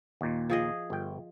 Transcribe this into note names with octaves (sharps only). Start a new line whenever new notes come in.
D#2 A#2
F3 G#4 D#5
G1 G5